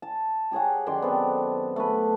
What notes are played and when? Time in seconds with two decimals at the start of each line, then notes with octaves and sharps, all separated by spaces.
0.02 A5
0.51 G4 G#4 C#5 F#5
0.86 F#2 D#3 D5 C6
1.02 B3 C4 A4
1.76 A3 B3 B4